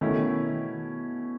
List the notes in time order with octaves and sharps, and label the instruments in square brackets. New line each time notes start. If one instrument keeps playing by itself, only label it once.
[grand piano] B2 A3 C#4 E4 [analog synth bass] D#3